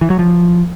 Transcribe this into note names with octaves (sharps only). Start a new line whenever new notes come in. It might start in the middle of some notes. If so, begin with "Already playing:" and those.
E3
F#3
F3